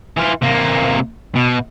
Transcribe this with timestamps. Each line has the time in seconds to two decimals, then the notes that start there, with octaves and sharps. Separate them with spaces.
0.17 E3 F4
0.42 C3 A#3
1.35 B2